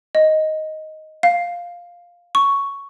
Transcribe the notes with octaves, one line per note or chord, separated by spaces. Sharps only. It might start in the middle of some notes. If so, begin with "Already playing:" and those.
D#5
F5
C#6